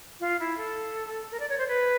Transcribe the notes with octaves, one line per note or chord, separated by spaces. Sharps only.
F4
E4
A4
A#4
D5
C#5
C5
B4